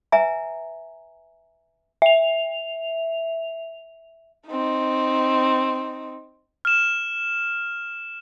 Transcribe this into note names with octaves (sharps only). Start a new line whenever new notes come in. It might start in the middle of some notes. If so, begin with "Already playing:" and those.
B4 E5 G#5 A#5
E5 F7
C4 D#4
F6 E7